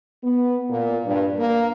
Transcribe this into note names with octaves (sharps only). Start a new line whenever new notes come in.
B3
A#2
G2
A#3